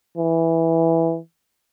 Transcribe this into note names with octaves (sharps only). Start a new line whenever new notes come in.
E3